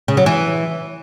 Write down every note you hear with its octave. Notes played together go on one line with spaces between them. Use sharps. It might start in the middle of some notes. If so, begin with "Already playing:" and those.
C#3
F#3
E3